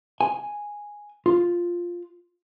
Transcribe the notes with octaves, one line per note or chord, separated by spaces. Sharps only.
G#5
F4